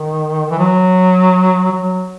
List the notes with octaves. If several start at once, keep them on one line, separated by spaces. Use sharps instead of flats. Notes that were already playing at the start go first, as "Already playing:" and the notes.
Already playing: D#3
E3
F#3
F#3